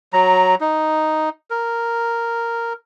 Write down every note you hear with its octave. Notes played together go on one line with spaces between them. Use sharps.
F#3 A#5
D#4
A#4